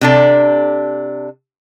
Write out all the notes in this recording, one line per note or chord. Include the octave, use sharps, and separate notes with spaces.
C3 D4 A4